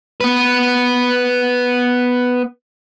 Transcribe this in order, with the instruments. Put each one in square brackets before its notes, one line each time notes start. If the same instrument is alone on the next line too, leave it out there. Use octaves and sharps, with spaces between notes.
[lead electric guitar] B3 B4